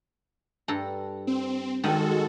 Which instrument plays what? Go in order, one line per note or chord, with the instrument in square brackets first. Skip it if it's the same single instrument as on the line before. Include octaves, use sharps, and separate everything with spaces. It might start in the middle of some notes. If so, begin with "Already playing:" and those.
[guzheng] G2 A4 A#5
[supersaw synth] C4
[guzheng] D#3 [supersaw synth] G#3 F#4 A4